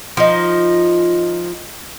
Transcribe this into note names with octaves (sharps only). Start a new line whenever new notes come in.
F3 D#4